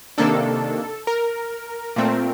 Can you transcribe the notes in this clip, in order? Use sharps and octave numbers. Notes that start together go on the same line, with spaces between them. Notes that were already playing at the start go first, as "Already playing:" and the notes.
C3 D#3 A#3 D4 A4
A#4
A#2 A3 C4